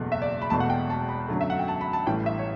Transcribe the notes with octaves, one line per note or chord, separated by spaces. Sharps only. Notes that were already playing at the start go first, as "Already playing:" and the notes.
Already playing: F#1 E2 B2 A3
E5
D5
B5
E1 E2 B2 A3 A5
F#5
G5
A5
B5
F#2 D3 F#3 A3
E5
F#5
G5
A5
B5
A5
A1 A2 E3 G3 G5
E5
C#5